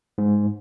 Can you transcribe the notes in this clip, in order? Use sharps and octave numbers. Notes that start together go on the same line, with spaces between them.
G#2